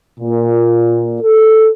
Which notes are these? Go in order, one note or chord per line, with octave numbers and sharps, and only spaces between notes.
A#2
A4